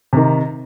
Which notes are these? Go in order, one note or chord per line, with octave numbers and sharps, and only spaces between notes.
C3 D#3